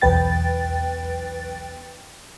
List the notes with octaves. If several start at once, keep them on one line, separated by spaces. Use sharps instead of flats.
B1 E2 B4 G5 A6